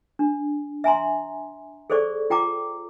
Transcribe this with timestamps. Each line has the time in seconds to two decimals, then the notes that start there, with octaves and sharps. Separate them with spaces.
0.19 D4
0.84 E5 G#5 A#5 C6
1.90 G#4 A4 C5 D5 C#6
2.30 F4 G5 A#5 D6